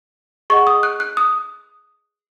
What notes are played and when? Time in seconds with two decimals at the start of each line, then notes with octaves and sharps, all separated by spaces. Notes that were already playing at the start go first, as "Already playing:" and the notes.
0.50 G#4 D#5 F#5 C#6
0.67 D#6
0.83 F#6
1.00 F#6
1.17 D#6